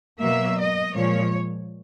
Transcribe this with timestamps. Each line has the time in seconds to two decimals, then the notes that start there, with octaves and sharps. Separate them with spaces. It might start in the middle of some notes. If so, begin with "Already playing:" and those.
0.20 B2 F#3 A#3 E5
0.58 D#5
0.95 A#2 F3 G#3 C#5